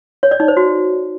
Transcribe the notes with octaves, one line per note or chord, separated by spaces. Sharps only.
C#5
D5
D#4
C5
F#4